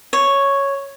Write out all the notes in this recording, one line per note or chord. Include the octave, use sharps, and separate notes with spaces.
C#5